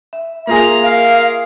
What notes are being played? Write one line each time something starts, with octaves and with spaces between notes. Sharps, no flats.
E5
A#3 F4 G#4 A#5
A#4 F5